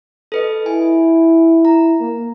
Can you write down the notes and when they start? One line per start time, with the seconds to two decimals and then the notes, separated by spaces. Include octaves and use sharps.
0.32 A4 B4 D#5
0.66 E4 G#5
1.65 A#5
2.00 A#3